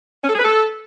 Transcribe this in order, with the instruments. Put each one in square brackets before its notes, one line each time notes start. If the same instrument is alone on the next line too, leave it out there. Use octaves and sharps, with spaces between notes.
[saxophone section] C#4
A4
G#4
B4
A4